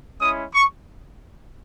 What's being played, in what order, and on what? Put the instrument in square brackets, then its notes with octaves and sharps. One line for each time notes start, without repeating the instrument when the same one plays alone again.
[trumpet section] G#3 C#4 E4 D#6
C#6